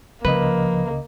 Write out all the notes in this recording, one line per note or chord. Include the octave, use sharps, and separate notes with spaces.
C#2 C#3 F3 A#3 B4 D#5